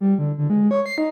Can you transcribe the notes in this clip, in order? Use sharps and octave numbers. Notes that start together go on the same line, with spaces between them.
G3
D3
D3
G#3
C#5
C7
D#4